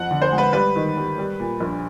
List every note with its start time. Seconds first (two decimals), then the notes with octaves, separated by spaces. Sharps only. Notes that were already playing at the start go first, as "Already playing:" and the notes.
Already playing: F2 F#5
0.11 D3
0.22 C5
0.32 G#3
0.38 B4
0.53 G3 B4
0.76 D#3
0.97 G3
1.18 G3
1.40 A#2
1.60 A#1